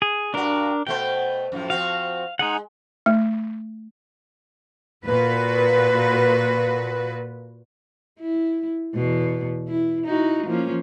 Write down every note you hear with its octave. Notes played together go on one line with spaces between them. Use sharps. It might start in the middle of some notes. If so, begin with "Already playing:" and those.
G#4
G2 D4 F#4 A#4
B2 A3 C5 G5
F#2 A2 F3
F3 C4 F#4 F5
G#3 D#4 G#4 F#5
A3
A#2 F#4 B4
E4
E2 B2
E4
D#4 E4 F#4
F3 A#3 C#4